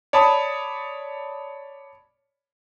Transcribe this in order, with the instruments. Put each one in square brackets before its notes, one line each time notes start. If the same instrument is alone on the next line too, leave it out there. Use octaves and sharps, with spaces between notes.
[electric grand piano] C#5 D5 A5 B5 D#6